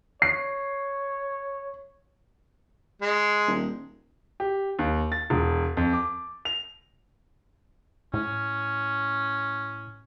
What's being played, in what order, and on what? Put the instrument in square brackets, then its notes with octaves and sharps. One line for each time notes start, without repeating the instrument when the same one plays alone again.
[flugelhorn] C#5 [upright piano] C7
[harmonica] G#3
[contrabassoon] D#1
[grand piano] G4
D#2
A6
E1
F2
D6
F7
[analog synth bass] A2 [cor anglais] C#4